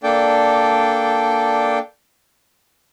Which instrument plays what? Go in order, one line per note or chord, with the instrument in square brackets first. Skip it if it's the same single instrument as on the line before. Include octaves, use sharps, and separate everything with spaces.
[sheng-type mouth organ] A#3 D4 A4 D5 G5